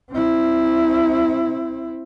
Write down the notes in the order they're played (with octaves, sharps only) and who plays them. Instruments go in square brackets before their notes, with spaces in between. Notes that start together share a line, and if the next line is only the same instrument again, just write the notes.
[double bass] C4 E4